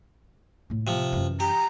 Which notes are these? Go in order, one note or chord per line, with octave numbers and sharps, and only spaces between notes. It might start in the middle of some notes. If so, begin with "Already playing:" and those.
A2 F4
C3 F3
F#2 E3
G4 A#5